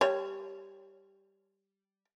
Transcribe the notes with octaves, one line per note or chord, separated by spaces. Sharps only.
G3 C#5